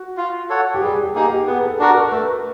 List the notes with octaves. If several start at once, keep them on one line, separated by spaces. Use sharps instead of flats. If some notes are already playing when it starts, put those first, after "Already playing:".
Already playing: F#4
F4
A4 C#5 F#5
G4
G3 G#4
G4
A#3 D#4 G4 G#4
G4
B3 G#4
A4
D4 F#4 A4 A#4
A#4
A3 B4